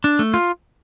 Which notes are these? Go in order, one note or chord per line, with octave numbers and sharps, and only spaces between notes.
D4
A3
F4